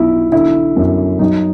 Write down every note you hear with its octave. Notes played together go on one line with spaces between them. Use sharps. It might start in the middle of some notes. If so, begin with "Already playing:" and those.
Already playing: B1 E4 F4
D3 E4
F#2
F#3 D#4